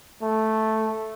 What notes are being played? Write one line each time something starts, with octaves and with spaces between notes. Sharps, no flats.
A3